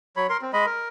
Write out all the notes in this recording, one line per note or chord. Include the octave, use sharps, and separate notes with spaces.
F#3 C#5 B5
A#4 C6
C4
G#3 D#5 B5
A#4